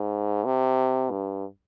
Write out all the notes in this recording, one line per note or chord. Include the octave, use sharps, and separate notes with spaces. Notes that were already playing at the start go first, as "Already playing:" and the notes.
Already playing: G#2
C3
G2